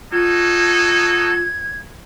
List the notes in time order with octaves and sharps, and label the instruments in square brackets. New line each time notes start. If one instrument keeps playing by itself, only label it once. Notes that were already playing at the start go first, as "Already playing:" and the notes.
[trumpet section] D#4 F#4 A4 [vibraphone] F4 [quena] G#6